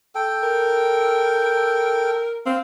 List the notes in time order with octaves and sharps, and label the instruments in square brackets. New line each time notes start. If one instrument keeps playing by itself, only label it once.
[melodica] A4 G5
[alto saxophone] A#4
[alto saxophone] C4 [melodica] F5